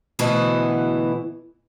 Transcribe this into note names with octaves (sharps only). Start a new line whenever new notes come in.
D2 B2 E3 B3 E4 A5